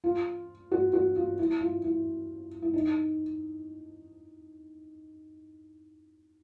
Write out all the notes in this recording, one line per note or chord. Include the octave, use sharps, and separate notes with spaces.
F4
F#4
F#4
F4
E4
F4
E4
E4
D#4